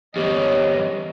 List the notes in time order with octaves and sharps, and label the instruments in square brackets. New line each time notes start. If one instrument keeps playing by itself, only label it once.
[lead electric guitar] E2 G2 [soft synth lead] G4 [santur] C#5 D6 [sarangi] D#5